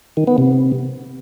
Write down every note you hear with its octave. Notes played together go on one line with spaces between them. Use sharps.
D#3
B3
C3